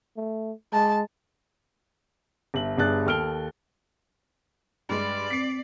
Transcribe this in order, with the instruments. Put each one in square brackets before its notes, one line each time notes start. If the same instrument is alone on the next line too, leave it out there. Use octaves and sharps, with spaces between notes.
[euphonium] A3
[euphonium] G#3 [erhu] A5
[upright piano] G1 E5 F#7
G1 G2 G#4 D5 F#6 A6
D#2 A4 F6 D7 G7
[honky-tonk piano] G2 G#3 [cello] D5
[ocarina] C4 [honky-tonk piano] B6 C7